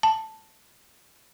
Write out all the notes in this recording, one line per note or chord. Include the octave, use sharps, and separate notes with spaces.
A5